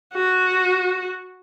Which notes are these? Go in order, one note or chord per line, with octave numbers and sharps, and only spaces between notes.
F#4